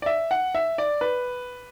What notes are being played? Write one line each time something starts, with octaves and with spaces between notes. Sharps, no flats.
D5
E5
F#5
E5
D5
B4